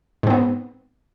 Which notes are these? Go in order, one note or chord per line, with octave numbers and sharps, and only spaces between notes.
G#2 B3 C4